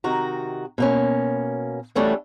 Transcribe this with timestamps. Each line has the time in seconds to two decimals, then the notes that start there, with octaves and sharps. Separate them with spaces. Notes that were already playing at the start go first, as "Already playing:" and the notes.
0.04 C3 D#3 F#4 A#5
0.78 B2 A#3 C#4
1.95 E3 G3 A3 C#4 D4 F#4